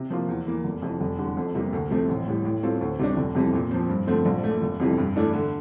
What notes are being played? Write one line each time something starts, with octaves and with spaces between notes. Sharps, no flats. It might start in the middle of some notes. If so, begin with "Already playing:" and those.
Already playing: C3
F3 A#3 F4
E2
E3 A#3
F1
F2 C3 E3
F1
E2 D3 G3
F2
C3 G3 A#3
D2
C3 F3 A3 C4
A1
A2 G3
A2
G3 C4 F4 A4
D2
C3 G3 D4
F1
F2 C3 E3 G3
A#2
F3 C4
G2
D3 F3 A3 C4
A#1
A#2 A3
F1
F2 C3 E3 G3
G2
E3 A3 D4 A4
D3